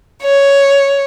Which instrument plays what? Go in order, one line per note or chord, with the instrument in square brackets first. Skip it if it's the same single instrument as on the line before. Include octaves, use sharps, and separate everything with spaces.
[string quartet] C#5